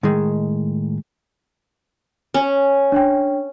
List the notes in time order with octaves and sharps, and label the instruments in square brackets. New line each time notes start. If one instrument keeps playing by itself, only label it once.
[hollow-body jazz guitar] A2 D#3 G#3
[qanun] C#4
[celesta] D4 C#5 G5